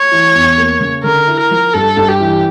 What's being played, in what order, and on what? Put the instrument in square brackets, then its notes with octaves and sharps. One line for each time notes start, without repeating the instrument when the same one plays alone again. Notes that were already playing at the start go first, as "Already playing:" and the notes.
Already playing: [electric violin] C#5
[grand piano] E3
E2
A#3
C#3
[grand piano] D3 [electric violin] A#4
[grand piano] E4
[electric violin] A#4
[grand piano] F3
[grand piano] G2 [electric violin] A4
[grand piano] G2
[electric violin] G4
[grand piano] E3